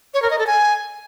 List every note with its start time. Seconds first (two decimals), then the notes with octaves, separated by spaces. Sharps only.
0.14 C#5
0.22 A#4
0.30 D#5
0.39 A4
0.47 G#5